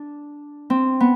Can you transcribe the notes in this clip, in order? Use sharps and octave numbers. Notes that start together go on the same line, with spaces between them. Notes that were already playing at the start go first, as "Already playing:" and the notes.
Already playing: D4
C4
B3